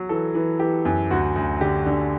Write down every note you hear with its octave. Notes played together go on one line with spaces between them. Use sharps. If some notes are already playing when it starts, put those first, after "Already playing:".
Already playing: F#3
E3 A4
E3
E3 G4
F#2
D2 F#4
D2
D3 G4
D3